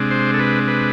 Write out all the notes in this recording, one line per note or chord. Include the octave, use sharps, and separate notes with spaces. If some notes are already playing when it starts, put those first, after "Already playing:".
Already playing: C3 G#3 D4
C5
A4
B4
B4